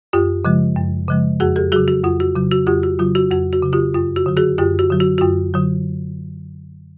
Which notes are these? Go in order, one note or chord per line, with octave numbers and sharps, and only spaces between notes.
F#2 F4 G4
C#3 F3 G#3
F#2
C#3 F3 G#3
F2 F#4 G#4
G4 A4
C#3 F#3 F#4 G#4
F#4
F2 F4
F#4
C#3 F#3
F#4
F2 F4 G4
F#4
C#3 F#3 F4
F#4
F2 F#4
F#4
C#3 F#3
F4 G4
F#2 F4
F#4
D3 F#3
F#4 G#4
F#2 F4 G4
F#4
D3 F#3
F#4
F#4
F#2 F4
D3 F#3